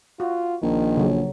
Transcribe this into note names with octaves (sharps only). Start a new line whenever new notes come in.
F4 F#4
A#1 D#3
C#3 F#3